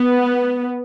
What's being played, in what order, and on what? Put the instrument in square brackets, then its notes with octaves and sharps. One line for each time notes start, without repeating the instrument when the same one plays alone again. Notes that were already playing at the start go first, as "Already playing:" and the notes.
Already playing: [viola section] B3